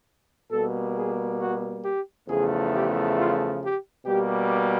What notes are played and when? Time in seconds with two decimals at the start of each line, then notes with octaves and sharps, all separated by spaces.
0.51 B2 G3 A#3 A4
0.96 G#4
1.40 F#4
1.85 G4
2.29 E2 C#3 F3 A3 G#4
2.74 G4
3.18 F4
3.62 G4
4.06 B2 G3 A#3 G4